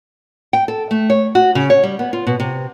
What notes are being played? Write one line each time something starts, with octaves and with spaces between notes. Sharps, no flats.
G5
A4
A3
C#5
F#4
C#3
C#5
G3
B3
F4
B2
C3